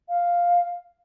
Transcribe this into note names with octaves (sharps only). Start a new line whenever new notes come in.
F5